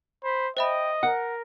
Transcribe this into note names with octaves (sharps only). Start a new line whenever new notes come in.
C5 B5
C5 D#5 E5 G5 B5
A#4 F#5